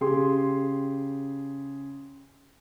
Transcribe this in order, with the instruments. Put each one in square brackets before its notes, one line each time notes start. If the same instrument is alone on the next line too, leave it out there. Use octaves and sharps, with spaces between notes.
[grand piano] C#3 G4 G#4 C6